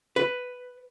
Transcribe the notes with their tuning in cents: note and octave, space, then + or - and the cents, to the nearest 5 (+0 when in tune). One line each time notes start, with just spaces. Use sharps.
B4 +5